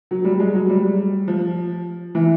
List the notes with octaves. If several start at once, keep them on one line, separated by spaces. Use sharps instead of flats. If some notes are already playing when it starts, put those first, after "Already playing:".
F#3
G3
G#3
F#3
G3
F3
E3